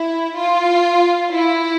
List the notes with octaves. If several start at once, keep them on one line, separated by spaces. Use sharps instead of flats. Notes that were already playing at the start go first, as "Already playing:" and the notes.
Already playing: E4
F4
E4